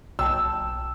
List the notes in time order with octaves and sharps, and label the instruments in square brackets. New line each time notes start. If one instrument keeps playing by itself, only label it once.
[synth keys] B1 G5 A5 [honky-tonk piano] E6